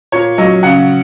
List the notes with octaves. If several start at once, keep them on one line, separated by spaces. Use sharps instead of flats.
A#2 C#5
F#3 D#5
C#3 F#5